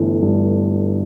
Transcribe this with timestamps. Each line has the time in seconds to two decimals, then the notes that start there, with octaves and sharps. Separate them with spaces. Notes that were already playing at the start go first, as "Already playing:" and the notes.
Already playing: G1 E3 A3
0.22 G2